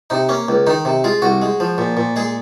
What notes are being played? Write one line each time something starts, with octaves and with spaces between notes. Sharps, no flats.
C3 D#4
A#3 C#4
C#2
D#3 D#4
C3
G#3 F4
C2 F#4
G#3
F3
A#2
A#2
G#3 G#4